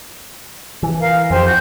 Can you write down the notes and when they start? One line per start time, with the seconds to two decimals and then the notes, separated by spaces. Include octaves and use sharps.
0.83 E3
1.00 A#4 F5
1.30 F2 G4 C5 G#5
1.45 F#4 F#6 G6